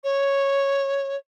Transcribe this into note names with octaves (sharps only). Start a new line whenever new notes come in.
C#5